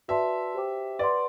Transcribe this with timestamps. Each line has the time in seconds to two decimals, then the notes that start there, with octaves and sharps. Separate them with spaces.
0.08 F#4 B4 D5 E5 A5 C6
0.54 G4 C5 G5 D6
0.99 B4 D5 F#5 C6